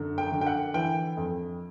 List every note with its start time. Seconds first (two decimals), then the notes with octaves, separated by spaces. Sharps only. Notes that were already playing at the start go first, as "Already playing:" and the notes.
Already playing: F#2 D3
0.18 G5
0.32 D3
0.41 G5
0.46 F#5
0.74 E3 G5
1.17 F2